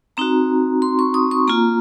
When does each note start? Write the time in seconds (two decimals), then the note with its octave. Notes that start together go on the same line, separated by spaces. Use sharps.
0.17 C4 D#4 F#4 A#5
0.82 C6
0.99 C#6
1.14 D#6
1.31 C#6
1.47 A#3 F4 A#5